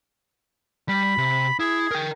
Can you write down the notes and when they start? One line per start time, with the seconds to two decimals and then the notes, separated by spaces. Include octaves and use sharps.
0.89 G3 B5
1.18 C3
1.60 E4 G#4
1.91 A#4 G5